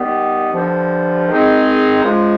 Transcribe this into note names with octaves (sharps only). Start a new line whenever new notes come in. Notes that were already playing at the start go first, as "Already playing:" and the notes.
Already playing: D#3 G3 B3
G2 D3 F3
D#3 G#3 C4 D#4 G#4
C#3 F3 G#3